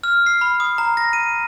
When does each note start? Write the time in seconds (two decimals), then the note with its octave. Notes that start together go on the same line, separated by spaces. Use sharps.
0.04 F6
0.26 C7
0.41 B5
0.60 D#6
0.78 A#5
0.97 A#6
1.13 D#7